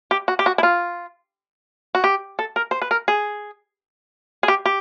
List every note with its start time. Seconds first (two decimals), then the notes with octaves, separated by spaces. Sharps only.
0.11 G4
0.28 F#4
0.39 G4
0.46 F#4
0.58 E4
0.63 F4
1.95 F#4
2.04 G4
2.39 A4
2.56 A#4
2.71 C5
2.82 B4
2.91 A#4
3.08 G#4
4.43 G#4
4.48 G4
4.66 G4